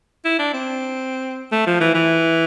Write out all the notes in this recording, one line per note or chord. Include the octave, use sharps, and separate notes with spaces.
E4
D4
C4
A3
F3
E3
E3